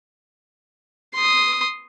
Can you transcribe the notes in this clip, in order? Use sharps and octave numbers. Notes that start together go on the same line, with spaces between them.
C6 D#6